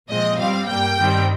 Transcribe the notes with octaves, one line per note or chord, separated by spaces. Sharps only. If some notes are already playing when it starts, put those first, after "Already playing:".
A#2 F3 G#3 C4 D#5
G2 G3 C4 F5
G2 G3 A#3 G5
G2 D#3 G3 C4